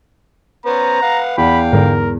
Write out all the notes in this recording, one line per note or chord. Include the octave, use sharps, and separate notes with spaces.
B3 C#4 C5 A#5
B4 F5 F#5
E2 F5 G5 B5
G#2 D3 A#4